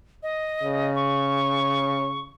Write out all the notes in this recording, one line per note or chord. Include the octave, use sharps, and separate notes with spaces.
D#5
C#3
C#6